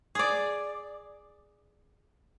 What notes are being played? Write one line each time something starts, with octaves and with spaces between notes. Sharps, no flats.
G#4 D5